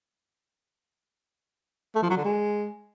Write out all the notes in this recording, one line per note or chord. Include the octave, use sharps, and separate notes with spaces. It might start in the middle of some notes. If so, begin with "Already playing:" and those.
A3
F3
F#3
D3
G#3